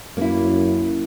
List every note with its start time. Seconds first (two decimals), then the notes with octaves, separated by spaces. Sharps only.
0.17 F#2 A#3 E4